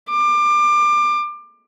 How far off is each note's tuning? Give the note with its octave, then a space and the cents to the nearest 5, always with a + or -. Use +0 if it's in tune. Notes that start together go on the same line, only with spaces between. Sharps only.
D6 +25